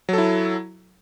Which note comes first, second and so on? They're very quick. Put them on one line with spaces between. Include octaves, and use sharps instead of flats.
F#3 A4 E4